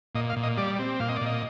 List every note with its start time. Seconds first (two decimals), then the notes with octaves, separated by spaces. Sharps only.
0.15 A#2 D#5
0.30 F5
0.36 A#2
0.43 D#5
0.58 G3 D5
0.79 C4
1.00 A#2 F5
1.09 D#5
1.16 D5
1.21 A#2 D#5